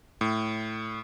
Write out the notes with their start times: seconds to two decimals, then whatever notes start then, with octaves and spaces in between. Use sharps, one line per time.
0.21 A2